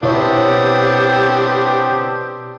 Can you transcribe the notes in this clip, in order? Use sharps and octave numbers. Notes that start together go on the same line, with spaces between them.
B2 B3 C4 D4 E4 G4 C#5